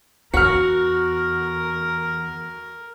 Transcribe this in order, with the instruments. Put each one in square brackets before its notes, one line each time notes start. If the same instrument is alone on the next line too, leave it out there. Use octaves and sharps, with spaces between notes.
[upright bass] E2 [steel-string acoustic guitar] F#4 [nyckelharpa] A#4 [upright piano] F6 C#7